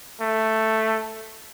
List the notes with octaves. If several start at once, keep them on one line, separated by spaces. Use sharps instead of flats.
A3